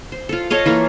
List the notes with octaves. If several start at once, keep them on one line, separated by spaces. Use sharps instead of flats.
C5
F4 A4
A4 C#5 D#5 F5
E3 A#3 F4 A4